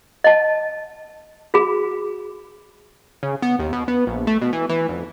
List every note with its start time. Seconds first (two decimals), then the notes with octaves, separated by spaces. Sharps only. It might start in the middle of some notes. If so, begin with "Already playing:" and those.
0.24 D#5 A5
1.54 F#4 G#4 B5
3.23 C#3
3.42 B3
3.59 D#2
3.73 B2
3.88 B3
4.07 A#1
4.27 A3
4.41 B2
4.53 E3
4.69 E3
4.89 F1